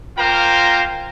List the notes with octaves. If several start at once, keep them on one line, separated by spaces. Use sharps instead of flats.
A#3 F4 A#4 C5 G5 A#5